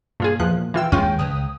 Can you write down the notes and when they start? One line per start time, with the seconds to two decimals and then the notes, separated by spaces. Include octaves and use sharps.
0.20 G2 A#2 F4 G#4
0.40 E2 F3 F#6
0.74 E3 F4 G5 E6
0.92 D#2 G#3 C#4 F4 G5
1.19 C#2 D#6